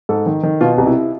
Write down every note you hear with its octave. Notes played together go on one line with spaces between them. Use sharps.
G#2 A4
D#3
D#3
B2 F4
C2
E4